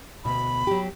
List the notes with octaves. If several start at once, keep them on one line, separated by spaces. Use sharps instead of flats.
D2 B2 B5
F#3 G4